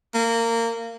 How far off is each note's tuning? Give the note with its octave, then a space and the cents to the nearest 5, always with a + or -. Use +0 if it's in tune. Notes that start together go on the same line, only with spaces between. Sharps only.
A#3 -20